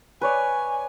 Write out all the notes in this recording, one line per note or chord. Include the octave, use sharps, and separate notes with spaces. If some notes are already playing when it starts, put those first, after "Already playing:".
B4 C#5 D5 G#5